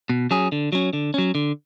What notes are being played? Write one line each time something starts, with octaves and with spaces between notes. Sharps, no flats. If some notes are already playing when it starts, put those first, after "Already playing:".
B2
F#3 C#4 G#4
D3
F#3 C#4
D3
F#3 C#4
D3